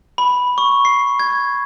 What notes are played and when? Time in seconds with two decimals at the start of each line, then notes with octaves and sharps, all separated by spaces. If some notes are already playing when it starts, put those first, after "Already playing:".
0.18 B5
0.58 C#6
0.85 C7
1.20 G#6